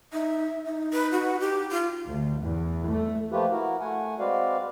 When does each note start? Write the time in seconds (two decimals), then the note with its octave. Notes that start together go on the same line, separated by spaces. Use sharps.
0.13 D#4 E5
0.66 D#4
0.93 B4
1.12 F#4
1.40 G4
1.72 F4
2.07 D2
2.42 E2
2.88 A3
3.32 F3 A3 A#3 F4 G4 B4
3.51 E4 F#4 A#4
3.80 A3 F#5 G#5
4.19 G#3 C4 F#4 B4 D5 F5